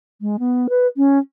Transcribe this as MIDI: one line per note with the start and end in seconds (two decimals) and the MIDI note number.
0.21 0.36 56
0.39 0.67 59
0.69 0.87 71
0.97 1.18 61